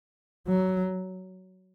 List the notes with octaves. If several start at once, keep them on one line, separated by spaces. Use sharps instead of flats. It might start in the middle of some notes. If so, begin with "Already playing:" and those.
F#3